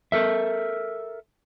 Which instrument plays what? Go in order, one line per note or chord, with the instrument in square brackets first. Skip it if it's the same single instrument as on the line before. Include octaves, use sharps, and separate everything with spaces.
[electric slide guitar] A4 A#4 E5